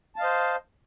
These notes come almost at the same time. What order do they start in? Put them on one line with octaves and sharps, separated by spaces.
A5 F5 D#5 C5